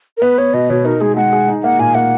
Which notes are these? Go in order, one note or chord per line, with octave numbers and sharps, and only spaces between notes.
A#4
B3 B4
B3 C#5
B2 D#5
B2 C#5
D#4 A#4
G#3 G#4
G#3 F#5
G#4
D#4
A#3 F#5
A#2 G#5
A#3 F#5